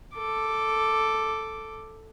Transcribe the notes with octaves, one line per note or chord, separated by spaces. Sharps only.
A4 D6